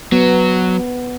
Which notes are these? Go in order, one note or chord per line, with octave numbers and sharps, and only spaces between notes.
F#3 B3